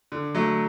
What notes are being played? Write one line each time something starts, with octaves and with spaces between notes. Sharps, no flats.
D3
F#3 A3